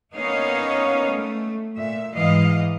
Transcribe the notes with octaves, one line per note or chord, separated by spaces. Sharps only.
A#3 B3 C#4 D#4 C#5 F5
A3
A#2 E5
G#2 E3 D#5 F5